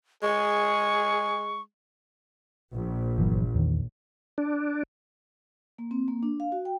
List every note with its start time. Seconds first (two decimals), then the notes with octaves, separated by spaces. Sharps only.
0.23 G#3 G#4 C#6
2.74 A#1
3.18 G1 E3 F#3
3.55 E2 D#3
4.38 D4
5.78 A#3
5.91 C4
6.08 A#3
6.23 D4
6.40 F5
6.52 F#4
6.65 G5